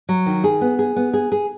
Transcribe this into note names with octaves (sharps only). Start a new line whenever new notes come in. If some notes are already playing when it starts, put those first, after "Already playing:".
F#3
D#3
G#4
B3
G#4
B3
G#4
G#4